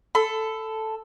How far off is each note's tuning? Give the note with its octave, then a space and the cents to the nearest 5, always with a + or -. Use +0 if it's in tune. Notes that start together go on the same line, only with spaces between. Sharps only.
A4 +0 B5 +35